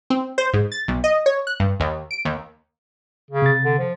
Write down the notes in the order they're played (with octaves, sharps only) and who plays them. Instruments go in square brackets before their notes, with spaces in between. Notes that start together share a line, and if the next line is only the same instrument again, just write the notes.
[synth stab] C4
C5
G#2
A6
B1
D#5
C#5
F#6
G2
D#2
D7
D#2
[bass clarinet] C#3
[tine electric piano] C3 A6
[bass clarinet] D3
F3